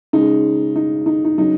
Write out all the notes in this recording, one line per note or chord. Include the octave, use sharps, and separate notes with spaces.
C#3 G#3 D#4
D#4
D#4
D#4
C#3 F#3 D#4